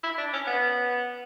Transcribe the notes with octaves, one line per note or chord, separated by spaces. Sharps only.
E4
D4
C#4
B3